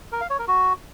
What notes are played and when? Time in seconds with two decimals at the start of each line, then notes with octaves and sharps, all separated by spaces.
0.12 A#4
0.21 F5
0.30 C#5
0.39 A#4
0.48 F#4